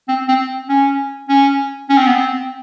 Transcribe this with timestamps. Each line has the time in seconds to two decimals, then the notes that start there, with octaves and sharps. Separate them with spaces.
0.08 C4
0.28 C4
0.69 C#4
1.29 C#4
1.89 C#4
1.98 C4
2.07 B3
2.16 C4